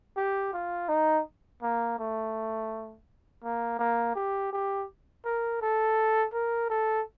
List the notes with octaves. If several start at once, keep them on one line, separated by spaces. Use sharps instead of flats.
G4
F4
D#4
A#3
A3
A#3
A#3
G4
G4
A#4
A4
A#4
A4